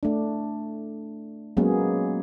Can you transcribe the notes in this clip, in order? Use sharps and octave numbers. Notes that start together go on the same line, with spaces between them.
A3 D4
F#3 G#3 A#3 B3 C#4 G#4